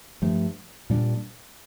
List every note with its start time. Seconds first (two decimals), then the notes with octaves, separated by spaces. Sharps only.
0.22 G2 F3 A3
0.90 A#2 G3 D4